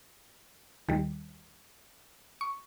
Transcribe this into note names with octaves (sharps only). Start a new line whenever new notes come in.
D#2 D#3 G3
C#6